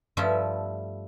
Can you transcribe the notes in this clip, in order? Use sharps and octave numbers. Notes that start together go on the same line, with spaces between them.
G2 F3 A3 E4 F4 E5